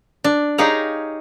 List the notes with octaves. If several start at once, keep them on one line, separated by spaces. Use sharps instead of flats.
D4
D#4 G4 G#4 C#5 F5 A#5